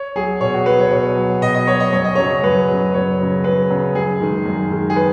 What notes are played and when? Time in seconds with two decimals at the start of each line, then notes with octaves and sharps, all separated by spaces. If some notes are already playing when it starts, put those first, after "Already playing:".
Already playing: C#5
0.16 F#3 G#4
0.41 B2 C#5
0.54 F#4
0.66 F#3 B4
0.79 C#5
0.91 B2 C#5
1.17 F#3
1.42 B2 D#5
1.55 D#5
1.67 F#3 C#5
1.80 D#5
1.93 F#2 C#5
2.04 D#5
2.15 C#3 F#3 C#5
2.43 F#2 B4
2.68 C#3 F#3
2.94 F#2 C#5
3.19 C#3 F#3
3.44 F#2 B4
3.70 C#3 F#3
3.95 F#2 G#4
4.20 D#3 G#3
4.46 F#2
4.71 D#3 G#3
4.90 G#4
4.96 B4